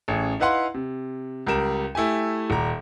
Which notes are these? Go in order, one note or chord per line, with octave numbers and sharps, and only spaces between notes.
A1 C#4 G#4
D#4 E4 B4 F5 F#5 C6
C3
C#2 G3 A#4 E7
A3 E4 G4 G#5
D#1 A#5